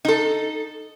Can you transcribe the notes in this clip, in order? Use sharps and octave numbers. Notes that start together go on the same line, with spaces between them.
D#4 A4